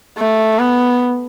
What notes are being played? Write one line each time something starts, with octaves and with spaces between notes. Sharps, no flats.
A3
B3